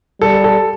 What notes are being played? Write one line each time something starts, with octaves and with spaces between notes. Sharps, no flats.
G3 A4
A4